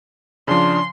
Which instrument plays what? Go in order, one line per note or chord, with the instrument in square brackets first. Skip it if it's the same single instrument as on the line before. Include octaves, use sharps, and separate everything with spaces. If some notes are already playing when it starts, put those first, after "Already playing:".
[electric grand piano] C#3 F3 [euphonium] D4 [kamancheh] C6